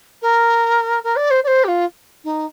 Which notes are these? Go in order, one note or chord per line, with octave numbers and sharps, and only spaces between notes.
A#4
A#4
D5
C5
D5
C5
G4
F4
D#4